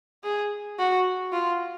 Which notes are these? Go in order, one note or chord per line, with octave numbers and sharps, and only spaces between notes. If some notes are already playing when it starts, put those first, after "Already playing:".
G#4
F#4
F4